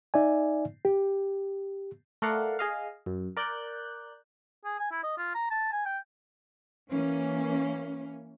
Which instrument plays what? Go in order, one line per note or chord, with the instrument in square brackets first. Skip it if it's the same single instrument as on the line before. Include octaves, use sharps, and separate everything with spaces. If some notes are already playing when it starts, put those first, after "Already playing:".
[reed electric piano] D#4 D5 E5 G#5
G4
[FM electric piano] A3 A4 A#4 D5 F5 F#5
G#4 D#5 F5
F#2
A#4 D5 F#6 G6
[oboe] G#4
G#5
E4
D#5
F4
A#5
A5
G#5
G5
[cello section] E3 A#3 C#4